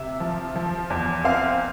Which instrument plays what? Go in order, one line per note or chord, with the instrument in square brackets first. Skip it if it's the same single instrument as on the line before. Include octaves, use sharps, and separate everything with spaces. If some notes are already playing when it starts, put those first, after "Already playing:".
Already playing: [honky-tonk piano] C3 E5
F3
F3
E2
C4 F5